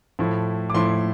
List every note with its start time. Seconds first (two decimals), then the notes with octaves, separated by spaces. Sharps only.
0.19 A2 F3 A3 E4
0.70 D6
0.74 A2 F3 A3 E4 C6